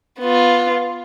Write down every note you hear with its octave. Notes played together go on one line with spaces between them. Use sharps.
B3 F4